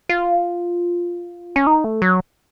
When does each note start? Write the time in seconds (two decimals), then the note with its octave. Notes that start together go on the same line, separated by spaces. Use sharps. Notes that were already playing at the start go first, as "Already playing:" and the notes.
0.09 F4
1.56 C#4
1.67 D#4
1.84 A3
2.02 F#3